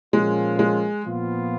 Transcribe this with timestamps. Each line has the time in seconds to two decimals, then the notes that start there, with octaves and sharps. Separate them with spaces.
0.13 A#2 F3 G#3 A#3 C#4 F4
0.59 G#3
1.05 A#2 F3 B3 F4